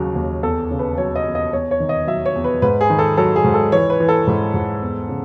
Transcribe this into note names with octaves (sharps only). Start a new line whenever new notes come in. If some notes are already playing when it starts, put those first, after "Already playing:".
Already playing: D#2 C#3 F#3
D#2
E2 A4
C#3
B4
F#3 C#5
D#5
E2
D#5
E2 C#5
C#5
D#3
D#5
F#3 E5
C#5
E2
B4
G#2 B4
G#4
D#3
A4
F#3 A4
G#4
G#2
A4
E3 C#5
B4
E3
A4
G#2
G#2
E2
C#3